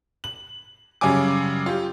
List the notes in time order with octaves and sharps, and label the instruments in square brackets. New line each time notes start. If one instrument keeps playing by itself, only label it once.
[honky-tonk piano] F#7
F#2 C#3 G3 C#4 G#5 D6
F4 G4